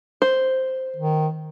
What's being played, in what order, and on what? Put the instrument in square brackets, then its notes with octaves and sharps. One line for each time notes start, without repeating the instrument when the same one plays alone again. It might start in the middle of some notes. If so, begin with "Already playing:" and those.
[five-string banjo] C5
[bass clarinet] D#3